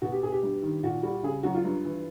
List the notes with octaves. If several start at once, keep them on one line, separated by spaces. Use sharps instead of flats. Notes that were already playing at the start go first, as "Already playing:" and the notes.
B2 F#4
G4
B2 G#4
G4
G2
D#3
A#2 F#4
G3 F#4
C#3 G#4
F#2 F#4
F4
G2
E3